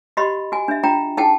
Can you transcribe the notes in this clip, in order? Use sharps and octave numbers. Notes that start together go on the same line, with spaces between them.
F#4 G4 D#5 B5 C6
F#4 G#5
D4 E5
D4 F4 G5 A#5
D#4 E4 G#4 F#5 G5 A5